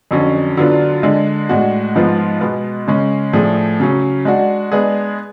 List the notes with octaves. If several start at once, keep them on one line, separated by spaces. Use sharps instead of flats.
F2 D3 F#3 C#4
D3 F#3 B3 D4 F4
D3 G#3 D4
A2 G#3 D4 F#4
G#2 F3 G#3 B3 F4
B2 G#3 B3
C#3 G#3 C#4
A2 F3 A3 D4 G#4
C#3 F#3 C#4
G#3 D4 F#4
G#3 B3 D4 G#4